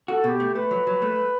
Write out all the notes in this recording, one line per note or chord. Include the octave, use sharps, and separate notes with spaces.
F#4 A4
B2 G4 A4
A3
A3 B4
F#3
F#3
A3